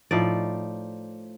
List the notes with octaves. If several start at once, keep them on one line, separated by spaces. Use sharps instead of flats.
A2 F3 D#4 D5